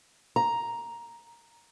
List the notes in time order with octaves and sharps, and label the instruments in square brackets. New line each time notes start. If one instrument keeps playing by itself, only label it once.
[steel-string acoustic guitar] A#5